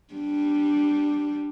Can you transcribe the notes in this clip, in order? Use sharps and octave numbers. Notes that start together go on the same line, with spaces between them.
G3 D4